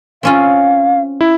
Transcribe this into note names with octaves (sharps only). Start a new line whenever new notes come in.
C4 C#4 F4 F5
E4